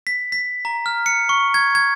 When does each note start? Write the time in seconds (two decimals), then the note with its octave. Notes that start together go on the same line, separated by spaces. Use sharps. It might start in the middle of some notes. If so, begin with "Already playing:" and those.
0.07 B6
0.32 B6
0.65 A#5
0.86 F6
1.06 C#7
1.29 C#6
1.54 G#6
1.75 G#6